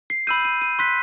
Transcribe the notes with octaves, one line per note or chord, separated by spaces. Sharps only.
C7
B5 E6 G6 D#7
D#7
D#7
C6 F#6 B6